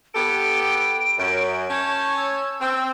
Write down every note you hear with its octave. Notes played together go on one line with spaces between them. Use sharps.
B3 G4 A4 D7
F#2
C#4 C#5 A5 G6
E6
C4